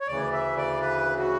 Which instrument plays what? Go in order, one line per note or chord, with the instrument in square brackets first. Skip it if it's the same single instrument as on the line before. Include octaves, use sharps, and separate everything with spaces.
[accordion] C#5
D2 C#3 E3 D5
E5
D5
B4
F#4